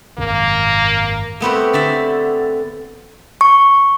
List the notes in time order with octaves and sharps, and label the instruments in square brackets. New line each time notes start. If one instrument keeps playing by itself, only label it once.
[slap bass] G#1 F#2 C3 [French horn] A#3
[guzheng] A3 B3 C4 G4
D3 D5 E5
[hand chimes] C#6